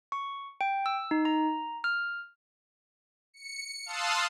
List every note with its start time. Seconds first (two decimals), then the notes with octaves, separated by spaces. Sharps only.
0.12 C#6
0.61 G5
0.86 E6
1.11 D#4
1.25 A#5
1.84 F6
3.34 C#7
3.86 F5 A5 C6 D#6 E6 F#6